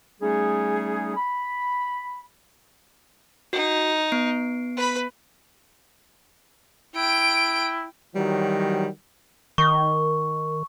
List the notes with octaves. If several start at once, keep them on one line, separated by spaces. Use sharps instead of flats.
G3 A3 C#4 D#4 G#4
B5
D#4 F#4
B3 C7 D7
B4 B5
E4 G5 D7
D#3 E3 F#3 G3
D#3 C#6